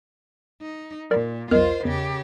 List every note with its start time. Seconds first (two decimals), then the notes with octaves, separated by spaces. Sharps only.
0.61 D#4
1.11 A#2 A#4 D5
1.51 B1 E2 F4 A#4 C5 D#5
1.85 E2 C#3 G4